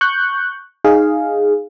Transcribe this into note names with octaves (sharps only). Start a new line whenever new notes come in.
C#6 F#6 G6
D#4 G#4 F5